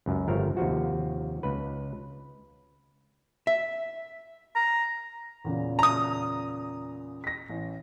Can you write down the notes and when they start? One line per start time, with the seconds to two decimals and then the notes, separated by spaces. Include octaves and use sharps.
0.06 C#2 F#2
0.28 G1 F3 A3 A#4 C#5
0.57 D#2 C3 F3 F#4
1.43 C#2 B4
3.47 E5
4.56 A#5
5.44 E2 A#2 C#3
5.79 A#5 D#6
7.24 A#6 B6
7.49 A1